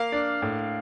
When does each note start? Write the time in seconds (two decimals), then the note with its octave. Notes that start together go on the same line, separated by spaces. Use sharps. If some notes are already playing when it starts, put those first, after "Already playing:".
Already playing: A#3 F5
0.12 D4
0.42 A2